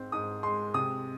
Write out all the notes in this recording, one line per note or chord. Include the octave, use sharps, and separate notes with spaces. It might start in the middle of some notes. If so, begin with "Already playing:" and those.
Already playing: G#2 C4
G#2 D#6
G#3 C6
C3 D#6